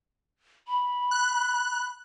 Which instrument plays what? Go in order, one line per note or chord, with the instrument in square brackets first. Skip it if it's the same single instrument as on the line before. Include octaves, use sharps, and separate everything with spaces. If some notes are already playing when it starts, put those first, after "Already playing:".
[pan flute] B5
[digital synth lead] F#6